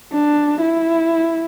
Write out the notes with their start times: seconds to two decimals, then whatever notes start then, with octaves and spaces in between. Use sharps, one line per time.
0.13 D4
0.61 E4